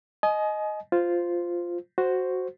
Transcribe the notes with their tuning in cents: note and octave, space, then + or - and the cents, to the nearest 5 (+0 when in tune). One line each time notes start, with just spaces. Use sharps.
D#5 +0 G#5 +35
F4 +0 C5 -10
F#4 +0 C5 +0